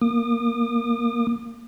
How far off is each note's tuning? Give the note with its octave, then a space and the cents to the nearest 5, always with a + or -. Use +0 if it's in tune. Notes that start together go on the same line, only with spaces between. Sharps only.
A#3 +0 D#6 -45